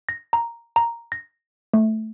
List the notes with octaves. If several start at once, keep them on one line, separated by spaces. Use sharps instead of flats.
A#6
A#5
A#5
A#6
A3